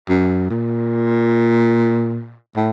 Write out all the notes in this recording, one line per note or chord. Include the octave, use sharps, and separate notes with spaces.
F#2
A#2
A2